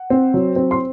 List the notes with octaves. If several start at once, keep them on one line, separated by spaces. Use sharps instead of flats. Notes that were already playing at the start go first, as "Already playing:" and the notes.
Already playing: F#5
C4
F#3
C4
C6